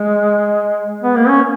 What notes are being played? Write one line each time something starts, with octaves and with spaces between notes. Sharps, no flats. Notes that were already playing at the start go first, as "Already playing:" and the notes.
Already playing: G#3
B3
A#3
C#4